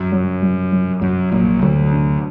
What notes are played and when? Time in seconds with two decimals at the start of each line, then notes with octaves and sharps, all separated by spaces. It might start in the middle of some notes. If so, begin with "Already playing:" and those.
Already playing: F#2 F#3
0.12 F#3
0.42 F#3
0.72 F#3
1.01 F#2 F#3
1.32 A#1 A#2 F#3
1.61 D2 D3 F#3
1.91 D4